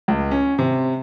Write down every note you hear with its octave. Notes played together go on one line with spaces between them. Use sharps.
C#2
C#4
C3